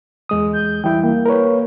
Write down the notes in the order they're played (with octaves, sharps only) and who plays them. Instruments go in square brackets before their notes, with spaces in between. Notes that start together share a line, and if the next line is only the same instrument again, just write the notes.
[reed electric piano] E2 G#3 D#6
[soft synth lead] G6
[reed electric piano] E3 G3 E4 [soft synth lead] G5
[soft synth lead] A#3
[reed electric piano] A#4 B4 C#5